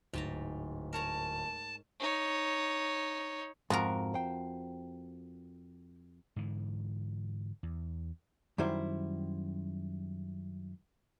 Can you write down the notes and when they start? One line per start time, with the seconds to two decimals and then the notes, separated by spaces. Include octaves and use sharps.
0.13 D1 G#2 A5 A#5
0.93 A#4 C#5 A5 A#5
2.00 D#4 C#5
3.70 F2 G#2 F3 F#4 A#4
4.14 C5 G5
6.36 G#2 D3 E3
7.63 E2
8.58 F#2 D#3 G3 E4 C5